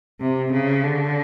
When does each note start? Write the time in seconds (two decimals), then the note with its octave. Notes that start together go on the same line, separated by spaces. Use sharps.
0.21 C3
0.52 C#3
0.83 D3